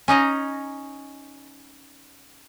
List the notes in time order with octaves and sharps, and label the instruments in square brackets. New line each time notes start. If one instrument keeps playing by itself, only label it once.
[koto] C#4 D#4 D#5 A#5